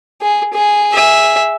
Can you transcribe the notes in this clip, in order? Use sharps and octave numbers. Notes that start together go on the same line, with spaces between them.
G#4
G#4
G#4 E5